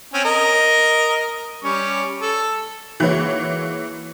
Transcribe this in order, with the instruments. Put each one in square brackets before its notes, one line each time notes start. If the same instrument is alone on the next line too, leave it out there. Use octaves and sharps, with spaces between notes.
[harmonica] C4 C#4 G#5
A#4 D#5
G3 C#4 C#6
A4
[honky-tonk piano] E3 G#3 A#3 E4 F#4 C#5